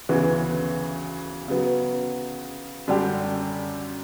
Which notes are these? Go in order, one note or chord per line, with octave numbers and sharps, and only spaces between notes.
D2 C#3 E3 B3
C#3 F#3 B3
F#2 D3 G3 D4 G4